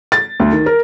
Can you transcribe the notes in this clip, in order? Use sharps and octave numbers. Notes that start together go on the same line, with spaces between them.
A6
D2
D#3
A#4